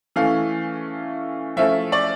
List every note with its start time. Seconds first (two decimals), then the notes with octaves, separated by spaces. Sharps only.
0.16 E3 A3 C#4 F5
1.57 F3 A3 C#4 E4 E5
1.92 D5